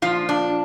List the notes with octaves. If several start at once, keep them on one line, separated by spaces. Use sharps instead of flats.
A#2 F3 F4
D4